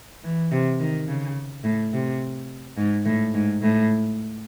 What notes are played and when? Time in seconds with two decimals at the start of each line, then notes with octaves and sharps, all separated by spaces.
0.24 E3
0.52 C3
0.80 D#3
1.08 C#3
1.64 A2
1.93 C3
2.77 G#2
3.06 A2
3.34 G#2
3.63 A2